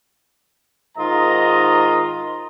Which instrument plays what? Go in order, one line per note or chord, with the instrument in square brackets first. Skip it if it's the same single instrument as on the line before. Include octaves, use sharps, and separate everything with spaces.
[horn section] G#2 D#3 F4 D#5 A#5